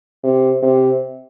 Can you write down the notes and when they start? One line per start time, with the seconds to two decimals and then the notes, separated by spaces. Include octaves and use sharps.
0.24 C3
0.62 C3